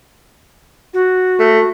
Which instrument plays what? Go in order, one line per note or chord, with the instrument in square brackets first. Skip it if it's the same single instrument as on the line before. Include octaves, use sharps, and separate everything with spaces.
[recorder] F#4
[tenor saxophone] A3